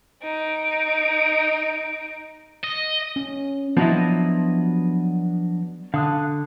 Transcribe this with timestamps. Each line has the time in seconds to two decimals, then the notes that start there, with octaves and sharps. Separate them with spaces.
0.22 D#4 D7
2.64 D#5
3.16 C#4
3.77 F3 F#3 B3 D4 E4 D#5
5.94 D3 F5 D#6 F#6